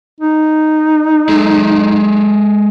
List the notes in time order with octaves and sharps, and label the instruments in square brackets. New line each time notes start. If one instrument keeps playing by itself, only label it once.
[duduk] D#4
[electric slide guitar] G#3 G#4 A4